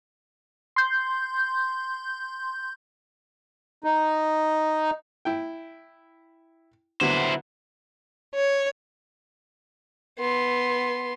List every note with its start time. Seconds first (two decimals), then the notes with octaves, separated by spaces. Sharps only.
0.76 C6 G6
3.84 D#4
5.25 E4 G5
7.01 D3 F#3 B3 E4 C5
8.34 C#5
10.19 B3 C6